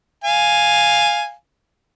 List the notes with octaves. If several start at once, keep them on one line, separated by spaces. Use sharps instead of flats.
F5 G#5